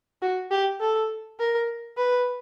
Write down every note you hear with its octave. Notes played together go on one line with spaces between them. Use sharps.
F#4
G4
A4
A#4
B4